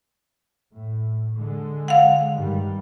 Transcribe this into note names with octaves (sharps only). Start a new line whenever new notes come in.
A2
D3 G#3
F5 F#5
G2 D#3 G3